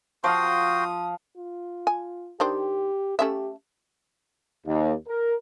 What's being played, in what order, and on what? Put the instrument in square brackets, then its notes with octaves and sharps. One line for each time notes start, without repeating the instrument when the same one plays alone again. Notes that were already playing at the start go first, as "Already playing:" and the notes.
[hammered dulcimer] F3 F5 [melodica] F#4 G5 C6 [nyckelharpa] D#6
[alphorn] F4
[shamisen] G#5
[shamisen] D#3 D4 C5 [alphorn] G4
[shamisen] A3 C#4 E5 [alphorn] G4
[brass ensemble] D#2
A#4